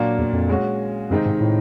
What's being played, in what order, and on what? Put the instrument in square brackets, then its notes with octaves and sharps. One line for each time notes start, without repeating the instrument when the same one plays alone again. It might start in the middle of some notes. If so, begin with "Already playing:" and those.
Already playing: [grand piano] A#2 F#3 A#3 D4
[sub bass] E2
F2
[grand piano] G#3 C#4 F#4
[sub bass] F#2 [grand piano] C3 D#3 G#3 C4 D#4
[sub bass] G#2
A2